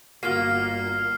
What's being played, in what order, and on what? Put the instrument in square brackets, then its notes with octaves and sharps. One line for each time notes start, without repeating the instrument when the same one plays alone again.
[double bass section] G1 [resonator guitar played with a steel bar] A#3 [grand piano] F4 F#4 [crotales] F6 C7